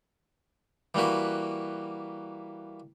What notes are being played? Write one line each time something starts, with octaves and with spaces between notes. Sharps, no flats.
E3 G3 A#3 F#4 B4